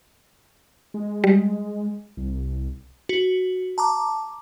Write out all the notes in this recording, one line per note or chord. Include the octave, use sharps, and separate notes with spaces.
G#3
G3
C2
F#4
A5 A#5 D6